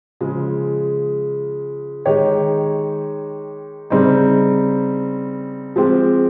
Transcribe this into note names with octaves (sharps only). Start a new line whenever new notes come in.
C#3 F3 G#3
D#3 G#3 D#4 G4 C#5
C#3 G3 C4 D#4
F3 G#3 C4 G4